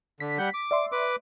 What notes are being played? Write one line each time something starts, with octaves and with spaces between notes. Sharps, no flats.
D3 B6
G3 F#5 G6
D6
D5 E5 C6
B4 D6